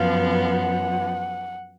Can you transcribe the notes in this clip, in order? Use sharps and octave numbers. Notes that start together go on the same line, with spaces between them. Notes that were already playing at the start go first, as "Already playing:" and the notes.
Already playing: F#2 F3 B3 F5
F#5